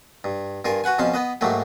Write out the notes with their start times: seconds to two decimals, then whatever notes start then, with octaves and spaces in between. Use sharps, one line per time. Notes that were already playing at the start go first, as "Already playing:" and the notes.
0.24 G2
0.65 G2 F4 A#4 G#5
0.84 F#4 B4 F#5 G#5
0.99 F2 B2 C#4 C5 F5
1.14 B3 B4 D#5
1.41 G#2 F#3 A3 A#3 G4